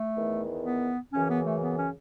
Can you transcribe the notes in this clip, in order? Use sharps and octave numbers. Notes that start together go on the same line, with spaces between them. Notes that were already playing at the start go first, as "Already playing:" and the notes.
Already playing: A3
E2 D#3
B3
F#2 C#3 E3 C#4
B3
A3
B3
C#4